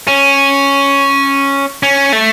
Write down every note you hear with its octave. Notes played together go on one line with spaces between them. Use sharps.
C#4
C#4
A3